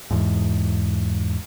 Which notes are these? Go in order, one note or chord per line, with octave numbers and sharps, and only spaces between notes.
E2 G#2